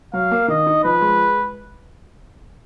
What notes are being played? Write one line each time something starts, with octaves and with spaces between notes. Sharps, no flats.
F#3 F5
A#3
D#3 D#5
D#4
F3 B4
G#3